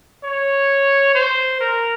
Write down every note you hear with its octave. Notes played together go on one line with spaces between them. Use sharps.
C#5
C5
A#4